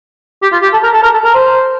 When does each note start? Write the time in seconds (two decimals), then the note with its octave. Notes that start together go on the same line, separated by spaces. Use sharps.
0.42 G4
0.52 F4
0.63 G4
0.73 A4
0.83 A#4
0.94 A4
1.03 A#4
1.14 A4
1.24 A#4
1.34 C5